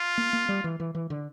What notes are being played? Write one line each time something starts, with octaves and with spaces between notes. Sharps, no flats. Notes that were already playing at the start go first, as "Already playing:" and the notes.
Already playing: F4
A#3
A#3
G3
E3
E3
E3
D3